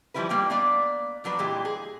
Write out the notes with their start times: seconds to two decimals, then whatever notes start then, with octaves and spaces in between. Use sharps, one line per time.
0.14 E3 F3 G3 E4 B4
0.29 G3 A#3 D4 G5
0.50 A#3 B3 D5
1.24 F3 F#3 D4 B4
1.39 A#2 E3 G#3 G4
1.65 G#4